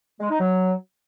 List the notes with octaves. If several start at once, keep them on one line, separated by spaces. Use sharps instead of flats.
G#3
D#4
F#3